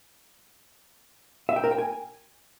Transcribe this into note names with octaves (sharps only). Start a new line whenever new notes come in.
E5
G5
A#4
G5
G#5